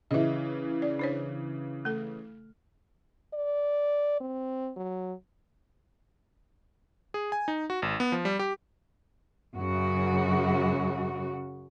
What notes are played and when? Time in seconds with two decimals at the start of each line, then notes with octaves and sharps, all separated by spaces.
0.11 C#3 E3 D#5 E5
0.82 D5
0.99 D4 C5 C#5
1.85 A3 A4
3.34 D5
4.21 C4
4.76 F#3
7.14 G#4
7.32 G#5
7.48 D#4
7.70 F#4
7.82 G#1
8.00 B3
8.12 F3
8.25 G3
8.39 G4
9.57 F#2 C#3 F#4